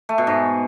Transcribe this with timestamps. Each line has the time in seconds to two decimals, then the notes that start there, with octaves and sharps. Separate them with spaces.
0.09 A3
0.18 B2
0.27 G#2